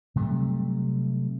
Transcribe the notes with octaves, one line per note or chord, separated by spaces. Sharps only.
C3 F#3 G3 A3